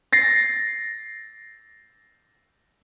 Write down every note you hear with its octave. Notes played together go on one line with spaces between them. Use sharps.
A6 A#6 C7